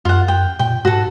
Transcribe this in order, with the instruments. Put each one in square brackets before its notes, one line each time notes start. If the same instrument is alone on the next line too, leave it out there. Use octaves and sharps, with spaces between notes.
[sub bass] F#2 [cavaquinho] F4 F#5
[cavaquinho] G5
[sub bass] A#2 [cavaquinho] G5
[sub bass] G#2 [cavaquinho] F#4 A4